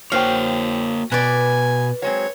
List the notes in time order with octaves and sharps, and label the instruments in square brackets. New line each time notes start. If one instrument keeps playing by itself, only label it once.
[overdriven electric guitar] A#3 C#5 [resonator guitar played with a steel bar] F#4 C5 G5 [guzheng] F5
[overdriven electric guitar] B2 [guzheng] B4 D5 [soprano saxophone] G#5
[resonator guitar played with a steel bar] F#3 G#3 C4 [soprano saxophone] C#5